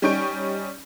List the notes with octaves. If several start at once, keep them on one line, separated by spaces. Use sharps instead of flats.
G3 C#4 D#4 C#6 G6 D7